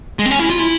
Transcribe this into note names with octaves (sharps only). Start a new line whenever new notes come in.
G#3
C4
C#4
E4
F4
E4